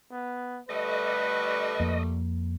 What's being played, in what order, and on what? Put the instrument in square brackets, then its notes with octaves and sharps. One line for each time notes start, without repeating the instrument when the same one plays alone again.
[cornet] B3
[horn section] D3 G3 A3 [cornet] B4 [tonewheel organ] D#5
[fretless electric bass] F2 A#3